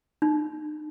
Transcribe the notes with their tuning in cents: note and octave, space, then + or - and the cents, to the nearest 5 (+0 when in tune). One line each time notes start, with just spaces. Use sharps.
D#4 -45